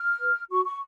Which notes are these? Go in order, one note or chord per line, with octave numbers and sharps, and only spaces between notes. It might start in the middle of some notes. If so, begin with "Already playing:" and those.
Already playing: F6
B4
F#4 C#6
C#6